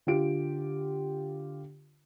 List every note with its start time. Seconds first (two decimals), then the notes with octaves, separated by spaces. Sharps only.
0.07 D3 F4 G4 D7